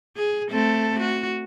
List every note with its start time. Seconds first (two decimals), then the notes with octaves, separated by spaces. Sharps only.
0.17 G#4
0.51 A3 C4 A4
1.00 F#4